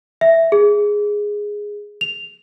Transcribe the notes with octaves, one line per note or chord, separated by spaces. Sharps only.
E5
G#4
F7